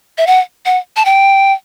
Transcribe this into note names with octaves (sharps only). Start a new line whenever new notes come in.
E5
F#5
F#5
A5
G5